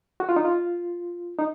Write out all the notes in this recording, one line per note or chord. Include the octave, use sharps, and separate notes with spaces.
F#4
F4
D#4
F4
D#4